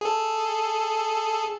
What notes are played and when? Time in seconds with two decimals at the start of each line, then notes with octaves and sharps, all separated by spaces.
0.01 G#4 A4